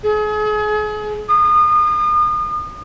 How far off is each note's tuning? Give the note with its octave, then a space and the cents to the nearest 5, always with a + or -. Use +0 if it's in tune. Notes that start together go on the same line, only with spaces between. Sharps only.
G#4 +35
D#6 -35